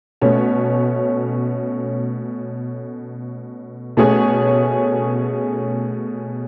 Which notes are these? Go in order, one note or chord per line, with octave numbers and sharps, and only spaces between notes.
B2 A3 C#4
B2 A3 C#4 G#4 C#5